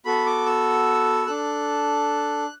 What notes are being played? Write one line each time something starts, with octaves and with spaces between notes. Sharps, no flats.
B3 F#4 A4 B5
D6
E6
D4 A4 F#6